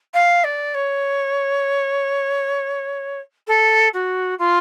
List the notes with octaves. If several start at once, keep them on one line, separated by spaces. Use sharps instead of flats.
F5
D5
C#5
A4
F#4
F4